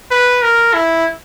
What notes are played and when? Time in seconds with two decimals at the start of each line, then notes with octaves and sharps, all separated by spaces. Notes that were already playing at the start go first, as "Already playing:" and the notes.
0.11 B4
0.42 A#4
0.74 E4